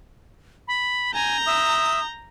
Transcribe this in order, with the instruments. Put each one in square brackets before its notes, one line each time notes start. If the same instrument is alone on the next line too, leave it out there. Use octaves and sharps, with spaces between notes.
[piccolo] B5
[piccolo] G#5 [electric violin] A#5 G6
[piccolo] E5 [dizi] D#6